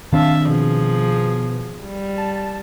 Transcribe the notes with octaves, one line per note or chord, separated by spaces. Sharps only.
D#3 C4 D4 E5 F5 A5
B2 F3 G#4
G3
A5